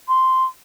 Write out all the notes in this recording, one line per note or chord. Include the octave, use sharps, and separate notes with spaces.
C6